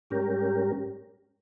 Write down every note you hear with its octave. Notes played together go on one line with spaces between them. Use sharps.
G#2 G3 C#4 G4 A#4